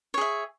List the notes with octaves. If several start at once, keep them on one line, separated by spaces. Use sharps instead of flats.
G#4 C#5 E5